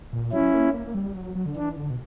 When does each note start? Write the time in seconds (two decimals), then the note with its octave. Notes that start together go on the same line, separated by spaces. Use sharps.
0.13 A#2
0.32 F#3 C#4 E4
0.54 A#3
0.74 A#3
0.87 A#3
0.94 G3
1.15 F#3
1.35 F#3
1.46 D3
1.56 E3 D4
1.76 D3
1.90 B2